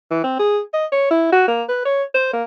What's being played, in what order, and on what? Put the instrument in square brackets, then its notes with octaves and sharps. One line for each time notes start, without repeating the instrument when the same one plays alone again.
[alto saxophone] E3
C4
G#4
D#5
C#5
E4
F#4
A#3
B4
C#5
C5
A#3